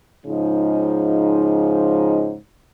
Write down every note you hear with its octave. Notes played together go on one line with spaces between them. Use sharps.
G#2 C#3 F3 D#4